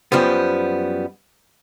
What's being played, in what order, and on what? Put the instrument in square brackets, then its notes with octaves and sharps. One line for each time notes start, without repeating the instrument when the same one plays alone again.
[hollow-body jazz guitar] F#2 F3 G3 B3